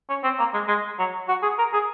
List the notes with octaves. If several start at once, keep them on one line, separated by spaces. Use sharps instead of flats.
C#4
C4
A#3
G#3
G#3
F#3
F#4
G#4
A#4
G#4